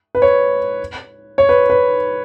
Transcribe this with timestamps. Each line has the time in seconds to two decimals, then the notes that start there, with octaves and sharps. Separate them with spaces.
0.15 B4
0.22 C#5
1.38 C#5
1.49 B4
1.70 B4